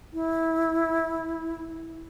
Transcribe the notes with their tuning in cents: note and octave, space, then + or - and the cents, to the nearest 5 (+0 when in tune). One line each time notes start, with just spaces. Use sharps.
E4 -15